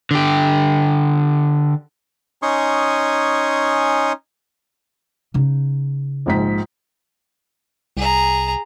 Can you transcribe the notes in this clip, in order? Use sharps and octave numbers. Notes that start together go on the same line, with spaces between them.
D3 G4
C#4 D#4 G#5 C6 C#6 D#6
C#3 D#4
A#1 G#2 B6
C2 G#4 A#5